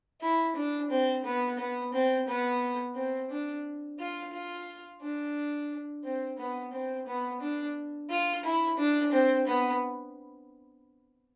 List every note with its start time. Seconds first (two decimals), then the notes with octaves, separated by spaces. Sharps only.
0.21 E4
0.56 D4
0.90 C4
1.24 B3
1.59 B3
1.93 C4
2.28 B3
2.95 C4
3.30 D4
3.99 F4
4.33 F4
5.01 D4
6.04 C4
6.38 B3
6.72 C4
7.07 B3
7.41 D4
8.10 F4
8.43 E4
8.78 D4
9.12 C4
9.47 B3